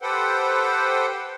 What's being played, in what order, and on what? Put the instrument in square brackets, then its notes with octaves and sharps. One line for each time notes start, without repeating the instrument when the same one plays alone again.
[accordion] G4 A4 B4 C5 F#5 G5